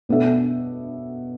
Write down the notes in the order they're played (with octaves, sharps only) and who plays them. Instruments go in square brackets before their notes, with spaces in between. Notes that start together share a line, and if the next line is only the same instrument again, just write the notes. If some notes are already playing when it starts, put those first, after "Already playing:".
[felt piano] B2 B3 D4 A4 E5